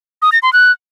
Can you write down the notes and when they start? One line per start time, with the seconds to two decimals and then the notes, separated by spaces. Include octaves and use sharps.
0.22 D#6
0.32 A#6
0.43 C6
0.53 F#6